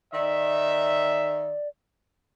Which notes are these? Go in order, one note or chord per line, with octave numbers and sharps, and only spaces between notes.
D#3 D5 E5